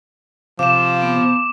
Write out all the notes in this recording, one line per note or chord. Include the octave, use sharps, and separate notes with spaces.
C3 F3 F5 D6 E7
B3